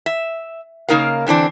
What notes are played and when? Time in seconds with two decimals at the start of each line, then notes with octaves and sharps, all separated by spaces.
0.06 E5
0.89 C#3 A#3 D#4 A#4 F5
1.26 D3 E3 C4 D4